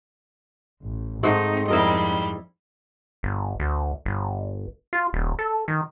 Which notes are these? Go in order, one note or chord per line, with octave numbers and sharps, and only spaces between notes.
A1
G#2 A3 C4 D#4
F2 G3 E4 A#4 D#5
G1
D2
G1
F4
D#1
A4
D#3